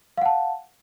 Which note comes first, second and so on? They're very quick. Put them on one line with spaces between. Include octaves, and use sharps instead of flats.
F5 F#5 A5